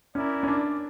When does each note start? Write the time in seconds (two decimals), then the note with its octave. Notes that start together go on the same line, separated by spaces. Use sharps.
0.15 C#4 E4 A#4 D5
0.43 C#4
0.48 D4